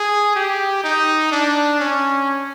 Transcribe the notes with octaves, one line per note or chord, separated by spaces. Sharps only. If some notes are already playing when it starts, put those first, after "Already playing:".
Already playing: G#4
G4
D#4
D4
C#4